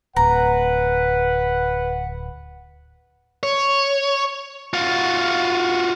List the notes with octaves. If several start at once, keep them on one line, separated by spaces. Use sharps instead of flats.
D1 B4 F#5 A#5
C#5
F4 F#4